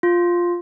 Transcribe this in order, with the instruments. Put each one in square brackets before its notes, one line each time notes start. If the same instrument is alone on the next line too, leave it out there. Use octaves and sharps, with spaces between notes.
[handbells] F4